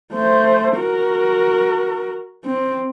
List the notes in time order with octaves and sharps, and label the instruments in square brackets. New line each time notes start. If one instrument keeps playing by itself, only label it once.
[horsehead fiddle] A3 C5
F#4 A#4
C4